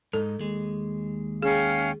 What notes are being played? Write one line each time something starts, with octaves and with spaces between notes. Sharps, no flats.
G#2 D#4 A4
D#2 G#3
C#4 G#4 F5 G5